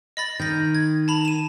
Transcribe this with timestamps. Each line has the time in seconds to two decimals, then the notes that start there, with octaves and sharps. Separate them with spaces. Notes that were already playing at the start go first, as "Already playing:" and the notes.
0.17 D#5 B5 A6
0.40 D#3 G6 A#6
0.75 G#6
1.08 A5 B5 F7
1.25 D#7 E7